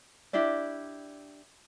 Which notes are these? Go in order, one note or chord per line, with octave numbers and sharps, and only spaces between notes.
D4 E4 G4 D5